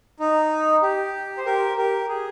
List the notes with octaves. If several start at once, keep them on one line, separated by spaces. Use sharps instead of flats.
D#4
G4
C5
G4 A#4
G4 A#4
G#4